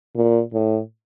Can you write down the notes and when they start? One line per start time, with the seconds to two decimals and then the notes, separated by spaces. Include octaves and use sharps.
0.15 A#2
0.53 A2